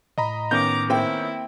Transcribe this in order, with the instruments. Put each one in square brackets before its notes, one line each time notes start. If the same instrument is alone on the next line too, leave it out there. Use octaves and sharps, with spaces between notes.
[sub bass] A2 [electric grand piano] D#5 A#5 B5
[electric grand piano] D#3 B3 C#4 [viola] A#5 D6 [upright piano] G6
[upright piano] A#3 C4 G5 [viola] E4